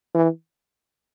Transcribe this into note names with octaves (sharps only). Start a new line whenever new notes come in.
E3